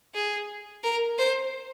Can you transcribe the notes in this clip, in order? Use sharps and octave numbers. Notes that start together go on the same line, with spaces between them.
G#4
A#4
C5